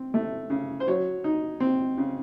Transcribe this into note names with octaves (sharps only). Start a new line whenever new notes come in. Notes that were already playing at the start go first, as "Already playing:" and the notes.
Already playing: C4
A3
C#3
C5
F#3 C#5
D#4
C4
C#3